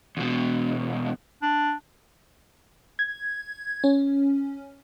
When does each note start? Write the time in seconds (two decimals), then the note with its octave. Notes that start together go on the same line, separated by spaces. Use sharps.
0.17 E2 B2
1.42 D4
2.99 G#6
3.84 C#4